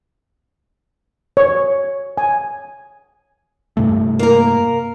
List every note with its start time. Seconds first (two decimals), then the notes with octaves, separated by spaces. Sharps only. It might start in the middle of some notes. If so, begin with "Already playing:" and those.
1.37 C#5
2.18 G#5
3.77 G2 C3 A3
4.19 A#3 A#4